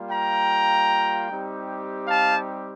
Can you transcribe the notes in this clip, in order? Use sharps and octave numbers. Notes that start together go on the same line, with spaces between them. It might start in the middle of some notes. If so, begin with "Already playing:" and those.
Already playing: G3 A#3 F4
G5 A#5
G3 C4 D#4 G4
F5 A5